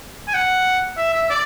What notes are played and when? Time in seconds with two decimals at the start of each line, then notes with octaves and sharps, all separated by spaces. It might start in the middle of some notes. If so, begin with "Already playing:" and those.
0.28 G#5
0.34 F#5
0.98 E5
1.14 E5
1.30 D5